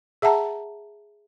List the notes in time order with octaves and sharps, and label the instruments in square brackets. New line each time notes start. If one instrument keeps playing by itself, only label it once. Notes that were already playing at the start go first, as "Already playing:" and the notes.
[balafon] G#4 E5 F#5 A5 A#5